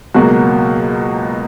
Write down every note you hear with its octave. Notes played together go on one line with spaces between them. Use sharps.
C#2 B2 F#3 A#3 F#4